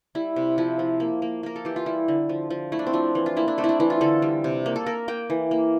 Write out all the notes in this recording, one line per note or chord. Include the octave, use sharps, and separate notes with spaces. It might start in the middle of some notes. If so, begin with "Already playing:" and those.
G3 E4
C3
F3 E4
F3
A#3
A#3
A#3 A#4
A4
E3 G4
F4
G3 E4
D3
F3
F3
A3 E4
D4
C4
F3 D4
E3
F4
A#3 E4
D4
A3 C4
E4
D4
E3 E4
F4
D3 A4
G3
C3
A#3
A4
A#3 A#4
A#3 G5
E3
A#3